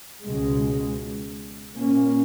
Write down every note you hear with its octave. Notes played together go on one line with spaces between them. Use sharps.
C#2 B2 G#3
A#2 A#3 C#4